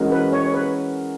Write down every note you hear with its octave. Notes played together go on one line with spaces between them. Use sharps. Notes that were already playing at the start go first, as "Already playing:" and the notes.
Already playing: E3 G#3 C#4 F#4 A#4
B4
C#5
B4